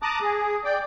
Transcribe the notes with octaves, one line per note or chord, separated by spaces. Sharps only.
A5 A#5 D6 D#6 F#6
G#4
D5 G5